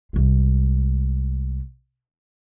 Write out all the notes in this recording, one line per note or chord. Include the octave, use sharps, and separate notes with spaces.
C2 G#3